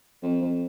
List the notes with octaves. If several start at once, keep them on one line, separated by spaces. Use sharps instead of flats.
F2
F2